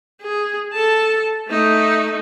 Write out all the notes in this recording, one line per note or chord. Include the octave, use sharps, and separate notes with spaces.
G#4
A4 A5
A3 D#4